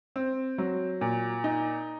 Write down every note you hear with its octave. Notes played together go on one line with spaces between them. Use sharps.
C4
F#3
A#2
D#4